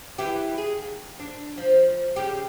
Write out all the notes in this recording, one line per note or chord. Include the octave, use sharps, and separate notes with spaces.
E3 E4 G4
G#4
D#2
D4
F3
C#3 G4